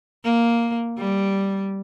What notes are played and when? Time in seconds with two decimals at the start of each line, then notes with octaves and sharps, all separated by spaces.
0.24 A#3
0.98 G3